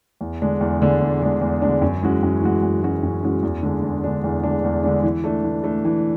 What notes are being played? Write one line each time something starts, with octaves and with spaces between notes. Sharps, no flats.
E2
D3 G#3 D4
E2
D3 G#3 D4
E2
D3 G#3 D4
E2
D3 G#3 D4
F#2
E3 G#3 C#4 F#4
F#2
E3 G#3 C#4 F#4
F#2
E3 G#3 C#4 F#4
F#2
E3 G#3 C#4 F#4
E2
D3 G#3 D4
E2
D3 G#3 D4
E2
D3 G#3 D4
E2
D3 G#3 D4
E3
A3 D4
E3
A3 D4
E3